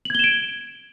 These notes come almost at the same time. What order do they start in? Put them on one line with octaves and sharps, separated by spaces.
F#7 G#6 G7 E7 D7